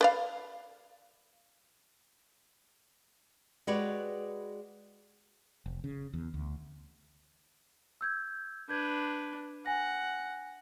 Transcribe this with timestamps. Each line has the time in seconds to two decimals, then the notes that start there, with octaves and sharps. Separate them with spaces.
0.01 B4 D5 F5
3.67 G#3 F#4 G4 B4 C#5 D5
5.66 F1
5.84 C#3
6.14 E2
6.34 D2
8.01 E6 G6 G#6
8.69 D4 B4 G6 G#6
9.66 F#5 G#5 A#6